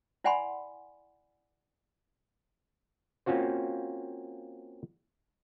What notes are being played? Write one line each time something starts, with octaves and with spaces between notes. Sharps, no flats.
E4 D5 F#5 G#5 B5 C6
A#3 C4 C#4 F4 F#4 C5